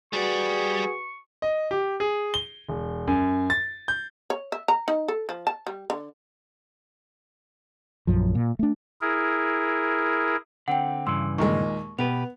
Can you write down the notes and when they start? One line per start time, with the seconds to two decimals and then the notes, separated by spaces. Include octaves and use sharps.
0.13 G3 F#4 G#4 B4 D5 F#5 C#6
1.42 D#5
1.71 G4
2.00 G#4
2.34 G7
2.69 E1
3.07 F#2
3.50 A6
3.88 G6
4.30 C#5
4.52 E5
4.68 A#5
4.88 D#4
5.08 A4
5.29 F3
5.47 A5
5.67 G3
5.90 D3
8.07 A#1 F#2 F3
8.35 A#2
8.59 A3 D4
9.01 E4 G#4 A#4
10.68 D3 C4 F#5 G5
11.07 G2 C#3 E3 C6 E6
11.38 D#2 A#2 G#3 C#6
11.99 B2 B3 G4 B4 F7